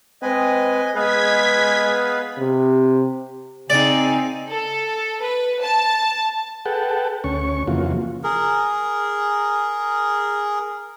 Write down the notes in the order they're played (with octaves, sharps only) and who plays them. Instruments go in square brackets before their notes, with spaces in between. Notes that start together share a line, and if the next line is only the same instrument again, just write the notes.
[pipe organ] G#3 B4 [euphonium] C4 [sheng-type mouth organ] D#5 G#5
[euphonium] G#3 [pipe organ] B3 G#4 F5 [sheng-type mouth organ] B4 [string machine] G#6 B6
[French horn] C3
[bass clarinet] C#3 [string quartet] C4 D#4 G#4 [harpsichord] D5
[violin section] A4
B4
A5
[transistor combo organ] G#4 A4 B4 F#5 G5 A5
D2 C#4 C#6
F2 C#3 E3 A#3 F4 F#4
[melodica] G#4 A#4